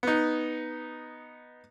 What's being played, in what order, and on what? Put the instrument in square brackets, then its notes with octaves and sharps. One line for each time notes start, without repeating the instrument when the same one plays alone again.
[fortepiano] B3 D#4